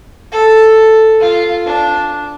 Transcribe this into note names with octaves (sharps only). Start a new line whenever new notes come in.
A4
F4
D4